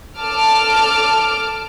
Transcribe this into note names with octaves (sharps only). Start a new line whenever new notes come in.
A4 A5 D6 F6